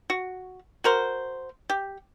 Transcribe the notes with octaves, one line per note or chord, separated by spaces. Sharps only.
F#4
F#4 A#4 C5
G4